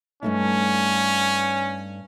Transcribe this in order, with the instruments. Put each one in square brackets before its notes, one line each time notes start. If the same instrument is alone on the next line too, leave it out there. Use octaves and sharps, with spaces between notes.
[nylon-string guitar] G2 A3 D#4 [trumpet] C#4